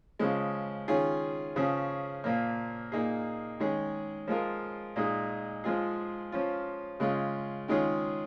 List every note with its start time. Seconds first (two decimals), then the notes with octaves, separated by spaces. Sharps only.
0.19 C#3 F3 G#3
0.88 D#3 C#4 F4 G#4
1.56 C#3 F3 C#4 G#4
2.24 A#2 F3 A#3
2.92 A#2 A#3 D#4 G#4
3.60 D#3 G#3 C#4 G#4
4.28 F3 G#3 F4 A#4
4.96 A#2 G#3 D#4 G#4
5.64 F3 G#3 F4 G#4
6.32 F3 C#4 F4
7.00 C#3 G#3 F4
7.68 D#3 G#3 C#4 F4 G#4